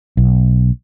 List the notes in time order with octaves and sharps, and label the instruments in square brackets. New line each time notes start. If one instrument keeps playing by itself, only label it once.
[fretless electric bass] B1